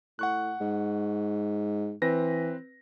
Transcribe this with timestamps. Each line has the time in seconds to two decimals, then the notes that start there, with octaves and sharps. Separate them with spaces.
0.19 A2 F#5 C#6 F#6
0.61 G#2
2.02 E3 C4 B4 A#6